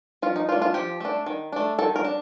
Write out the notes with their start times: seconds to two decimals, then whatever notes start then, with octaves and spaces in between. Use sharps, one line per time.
0.22 F3 F4
0.36 D#4
0.49 D4 F4
0.52 A3
0.62 F4
0.74 F3 G4
1.00 A3 D4
1.26 D#3
1.52 A3 D4
1.78 D#3 A4
1.96 A#4
2.04 D4